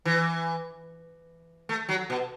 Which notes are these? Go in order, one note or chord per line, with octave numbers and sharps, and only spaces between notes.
E3
A3
F#3
B2